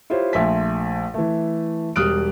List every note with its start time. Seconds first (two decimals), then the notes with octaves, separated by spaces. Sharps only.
0.10 E4 F4 G4 C5 C#5
0.33 A#1 A3 E5 G#5 C6 B6
1.14 E3 A3
1.96 E1 G3 D#6 F6 F#6 D7